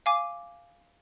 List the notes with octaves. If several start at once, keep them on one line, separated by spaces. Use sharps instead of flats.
F5 G#5 D6